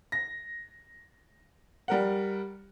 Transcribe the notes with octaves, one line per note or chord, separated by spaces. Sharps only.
A#6
G3 A#4 F#5